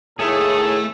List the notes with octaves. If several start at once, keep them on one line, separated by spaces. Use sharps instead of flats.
D#2 A2 A3 G#4 A4